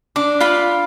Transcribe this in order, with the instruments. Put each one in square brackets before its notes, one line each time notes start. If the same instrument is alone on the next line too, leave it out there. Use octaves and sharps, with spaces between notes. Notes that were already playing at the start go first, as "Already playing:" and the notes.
[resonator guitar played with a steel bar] D4 [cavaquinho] D6
[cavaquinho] F4 F5 B5